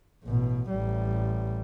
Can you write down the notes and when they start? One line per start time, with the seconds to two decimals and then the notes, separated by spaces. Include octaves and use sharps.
0.24 A1 B2
0.70 A1 G3